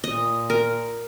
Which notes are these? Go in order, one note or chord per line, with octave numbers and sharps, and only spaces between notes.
A#2 D#5
A#4